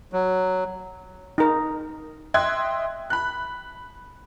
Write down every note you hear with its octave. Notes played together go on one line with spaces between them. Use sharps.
F#3
D#4 A#4
D#5 E5 G5 C6 F#6 G#6
B5 F#6